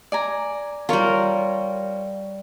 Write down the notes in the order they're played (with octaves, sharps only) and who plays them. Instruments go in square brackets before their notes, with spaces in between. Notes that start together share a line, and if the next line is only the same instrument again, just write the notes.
[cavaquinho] D5 G#5 A#5
[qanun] G3 A#4 [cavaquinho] F4 C#5